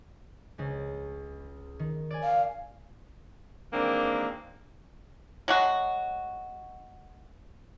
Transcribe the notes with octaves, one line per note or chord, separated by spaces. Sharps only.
C#2 G#3
D#3
D5 G#5
F5
D#3 E3 G#3 A#3 C4 D4
F#3 G#3 F#4